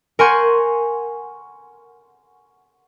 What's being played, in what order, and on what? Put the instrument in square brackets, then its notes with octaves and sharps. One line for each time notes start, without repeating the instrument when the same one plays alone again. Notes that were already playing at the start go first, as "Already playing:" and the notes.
[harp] A#4 F#5 G#5 C6 C#6 G6